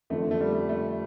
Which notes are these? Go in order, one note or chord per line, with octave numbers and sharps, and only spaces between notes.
F2 D3 F3 A3
A3
G3
A3